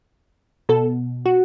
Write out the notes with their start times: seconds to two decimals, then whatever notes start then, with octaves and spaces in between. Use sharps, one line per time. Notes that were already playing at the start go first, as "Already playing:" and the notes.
0.69 B2 A4
1.26 F#4